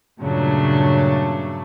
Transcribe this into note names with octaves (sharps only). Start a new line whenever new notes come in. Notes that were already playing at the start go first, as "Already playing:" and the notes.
G2 A#2 C#3 F#3 A3 D4